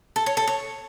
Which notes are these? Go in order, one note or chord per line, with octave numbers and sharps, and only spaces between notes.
A4
C#5
A4
C#5